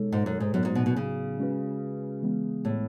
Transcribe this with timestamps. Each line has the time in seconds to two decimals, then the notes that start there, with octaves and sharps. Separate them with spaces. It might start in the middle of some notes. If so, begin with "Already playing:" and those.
Already playing: B2 G#3 D#4 A4 C#5
0.12 G#2
0.26 F#2
0.40 G#2
0.54 F#2 A2 F#3 B3 D#4 F#4
0.65 G#2
0.75 B2
0.86 B2
0.96 C#3
1.38 G#3 C#4 F#4 B4
2.22 E3 G#3 B3
2.65 A2